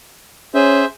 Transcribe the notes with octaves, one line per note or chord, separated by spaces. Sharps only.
C#4 G#4 C5 E5